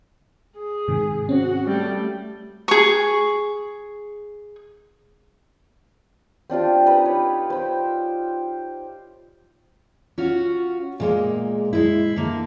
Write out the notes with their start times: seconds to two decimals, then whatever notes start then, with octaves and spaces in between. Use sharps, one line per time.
0.57 G#4
0.88 G#2 C3 D#3
1.29 C4 C#4 F#4
1.67 G3 A3
2.68 G#4 C#6
6.50 C4 D4 F4 G4
6.86 D#4 G4 B4 D#6
7.05 C#5
7.50 C5 G5
10.18 C#4 F4 F#4
11.00 A#2 G#3 A#3
11.73 G#3 E4
12.16 D3 A#3